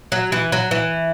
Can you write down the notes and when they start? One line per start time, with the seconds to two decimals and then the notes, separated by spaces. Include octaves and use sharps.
0.12 F#3
0.32 E3
0.52 F#3
0.71 E3